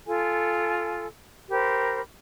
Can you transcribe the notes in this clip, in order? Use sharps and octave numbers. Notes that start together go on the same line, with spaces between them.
F4 A4 G#5
G4 A#4 C5 B5